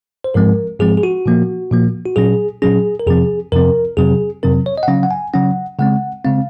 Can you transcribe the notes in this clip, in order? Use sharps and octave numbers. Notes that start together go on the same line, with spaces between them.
C5
G#2 F3 G#3 C4 A#4
G#2 F3 G#3 C4 G#4
G#4
F#4
A#2 F3 A#3
A#2 F3 A#3
F#4
A#2 F#3 C#4 G#4
A#2 F#3 C#4 G#4
A#4
F2 C3 F3 C4 G#4
F2 C3 F3 C4 A#4
F2 C3 F#3 C4 G#4
F2 C3 F#3 C4 A#4
C#5
D#5
F#5
C#3 F#3 C#4 F5
F#5
G#5
C#3 F#3 C#4 F#5
C#3 G#3 C4 F#5
C#3 G#3 C4 F5